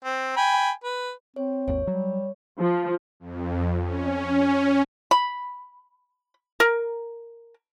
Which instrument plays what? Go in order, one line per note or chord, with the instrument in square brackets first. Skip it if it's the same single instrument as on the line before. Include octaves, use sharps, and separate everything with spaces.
[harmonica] C4
G5 G#5 B5
B4
[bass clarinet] C4 [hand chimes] C#5
[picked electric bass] G#1 D#2 [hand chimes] C#5
[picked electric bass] F#3 [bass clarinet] G3
[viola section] F3
[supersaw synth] F2
C#4
[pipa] B5
A#4